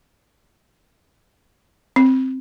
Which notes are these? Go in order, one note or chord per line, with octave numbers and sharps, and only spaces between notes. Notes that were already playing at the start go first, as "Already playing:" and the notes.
C4